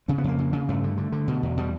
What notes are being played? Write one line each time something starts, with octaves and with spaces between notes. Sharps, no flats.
C#3 C4
B3
F2 A#3
C#3
C#3
G2 A3
D3
D3
D3
B2
E2
B2 G3